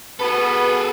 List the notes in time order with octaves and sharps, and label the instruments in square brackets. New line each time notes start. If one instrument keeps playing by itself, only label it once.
[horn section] B3 F#4 B4 [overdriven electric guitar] G#4 A4